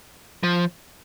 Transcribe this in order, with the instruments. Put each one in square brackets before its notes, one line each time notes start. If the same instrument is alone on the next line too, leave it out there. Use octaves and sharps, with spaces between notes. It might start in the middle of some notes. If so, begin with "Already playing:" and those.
[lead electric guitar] F3